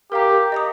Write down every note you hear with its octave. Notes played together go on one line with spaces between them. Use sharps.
G4 A#4 F5 A#5
D#5 A#5 D#6